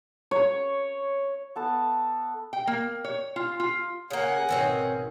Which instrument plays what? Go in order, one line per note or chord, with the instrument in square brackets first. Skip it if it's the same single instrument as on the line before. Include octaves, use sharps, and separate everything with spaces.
[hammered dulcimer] C#5
[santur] B3 A4 A5
[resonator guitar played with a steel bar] G5
A#3
C#5
F4
F4
[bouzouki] C#3 A#3 [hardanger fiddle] F#5 G#5
[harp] G#1 B2 [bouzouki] D#3 C4 C#4